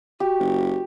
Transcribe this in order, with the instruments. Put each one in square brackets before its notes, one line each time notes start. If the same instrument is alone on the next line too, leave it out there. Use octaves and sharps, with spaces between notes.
[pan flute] F#4 [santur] G4
[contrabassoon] F#1